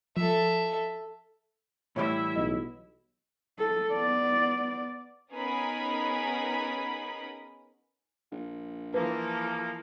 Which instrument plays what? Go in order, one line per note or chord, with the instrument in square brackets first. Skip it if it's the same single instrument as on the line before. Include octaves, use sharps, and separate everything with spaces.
[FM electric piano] F3 [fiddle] A4 E5
[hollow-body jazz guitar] A2 E3 G3 [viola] E4 E5 [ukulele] F#4 C#5
[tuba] B1 [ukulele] D#5 F#5
[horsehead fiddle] A4
B3 D5
[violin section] B3 C#4 D#4 G#4 A#4 B5
[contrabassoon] A#1
[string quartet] E3 F3 A4 [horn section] A#3 [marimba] B4